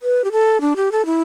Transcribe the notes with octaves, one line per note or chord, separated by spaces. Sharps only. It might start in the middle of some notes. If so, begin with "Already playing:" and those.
B4
G4
A4
D4
G4
A4
E4